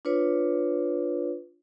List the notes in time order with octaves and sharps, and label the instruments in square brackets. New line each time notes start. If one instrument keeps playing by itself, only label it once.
[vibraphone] D4 F4 B4 C#5